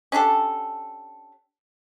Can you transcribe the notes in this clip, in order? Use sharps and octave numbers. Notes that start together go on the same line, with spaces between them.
C#4 D4 G4 A4